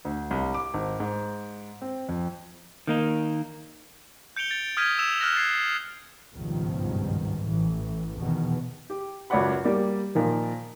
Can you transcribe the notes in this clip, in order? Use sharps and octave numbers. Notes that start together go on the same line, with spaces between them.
D2
C2
D6
G#1
G#2
C4
F2
D#3 A#3 D#4
G6 C#7 D7 F7 G7
A6 D7
D#6 F6 G6 G#6 B6 D#7
E6 E7 F7
F6 F#6 A6 A#6
G#6 A6 C7
G#1 C#2 G2 B2 D#3 F3
A1 A2 E3
E2 B2 D#3
G4
C#2 F#2 C#5 D5 F#5 B5
G3 A#3 D5
A#2 D#3 F3